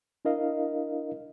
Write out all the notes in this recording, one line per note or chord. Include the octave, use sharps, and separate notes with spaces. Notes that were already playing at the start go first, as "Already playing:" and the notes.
D4 E4 A#4 D#5 F5